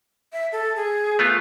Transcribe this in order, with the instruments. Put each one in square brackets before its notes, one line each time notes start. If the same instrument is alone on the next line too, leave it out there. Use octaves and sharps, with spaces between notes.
[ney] E5
A4
G#4
[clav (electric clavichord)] A3 B3 F4